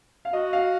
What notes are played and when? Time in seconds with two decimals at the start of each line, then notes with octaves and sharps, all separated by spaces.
0.25 F5
0.33 F#4 D#5
0.53 F5